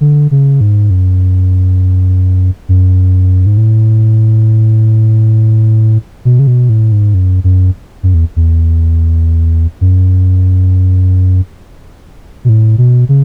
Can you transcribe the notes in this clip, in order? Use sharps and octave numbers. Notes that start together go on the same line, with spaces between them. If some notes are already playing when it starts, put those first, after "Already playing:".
D3
C#3
G#2
F#2
F#2
G#2
A2
B2
C#3
B2
A2
G#2
F#2
F#2
F#2
E2
E2
F#2
B2
A2
B2
C#3